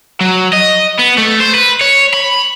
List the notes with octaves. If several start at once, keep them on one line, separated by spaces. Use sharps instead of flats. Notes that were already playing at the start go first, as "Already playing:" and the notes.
F#3
D#5
B3
A3
C5
B4
C#5
B5